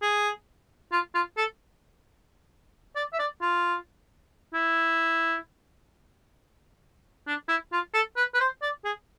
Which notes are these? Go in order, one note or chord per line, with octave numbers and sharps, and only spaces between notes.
G#4
F4
F4
A4
D5
E5
D5
F4
E4
D4
E4
F4
A4
B4
B4
C5
D5
G#4